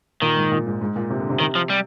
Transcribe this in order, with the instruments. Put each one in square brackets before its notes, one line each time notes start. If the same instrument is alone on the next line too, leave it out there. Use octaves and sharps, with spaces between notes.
[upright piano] A#2 [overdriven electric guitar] D#3
[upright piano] G#2
A#2
G#2
G#2
A#2
C3
D3
C3
[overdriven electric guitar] D#3
F3
G3